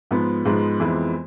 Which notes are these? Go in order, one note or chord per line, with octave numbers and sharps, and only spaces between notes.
G#2 F3 G#3 B3
G#2 F3 G#3 B3
F2 E3 G#3 B3